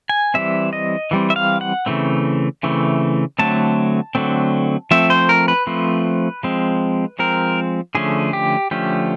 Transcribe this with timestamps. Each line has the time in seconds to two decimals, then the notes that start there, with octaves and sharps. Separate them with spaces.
0.09 G#5
0.34 E3 G3 C4 E5
0.73 D#5
1.11 E3 G3 C4
1.30 E5
1.36 F5
1.61 F#5
1.86 C#3 E3 A3 C4
2.63 C#3 E3 A3 C4
3.39 D3 F#3 A3 C4 A5
4.15 D3 F#3 A3 C4
4.91 F3 A3 C4 E5
5.10 C5
5.29 A#4
5.48 B4
5.67 F3 A3 C4
6.43 F3 G#3 C4
7.19 F3 G#3 C4 A#4
7.95 D3 F3 A3 C#4 G#4
8.33 G4
8.71 D3 F3 A3 C#4 G4